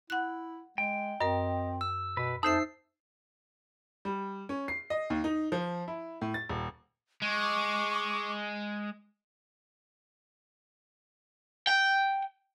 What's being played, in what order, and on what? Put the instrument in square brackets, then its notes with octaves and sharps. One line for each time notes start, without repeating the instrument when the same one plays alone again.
[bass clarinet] E4 [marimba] F#5 F#6
[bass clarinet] G#3 [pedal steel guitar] G5
[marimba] F#2 A#4 [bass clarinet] C4 [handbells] D#5
[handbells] E6
[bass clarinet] B2 [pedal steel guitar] B4
[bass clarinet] F2 [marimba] D#4 C5 E5 [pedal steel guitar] A5 G6 [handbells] E6 C7
[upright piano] G3
C#4
C7
D#5
D#2
D#4
F3
E4
A2
A6
D#1
[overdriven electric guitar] G#3 [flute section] C#6 D6
[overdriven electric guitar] G5